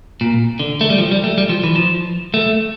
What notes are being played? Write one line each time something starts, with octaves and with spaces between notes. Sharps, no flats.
A#2
D3
A3
G3
F3
G3
A3
G3
F3
E3
F3
A3